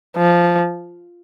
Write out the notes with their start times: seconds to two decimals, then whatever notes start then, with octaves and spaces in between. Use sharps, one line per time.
0.17 F3